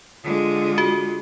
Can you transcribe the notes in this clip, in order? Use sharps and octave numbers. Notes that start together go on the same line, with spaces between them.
D3 G#3 F4
F#4